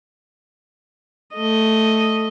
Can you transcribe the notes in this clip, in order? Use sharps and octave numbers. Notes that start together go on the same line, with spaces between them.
A3 D#5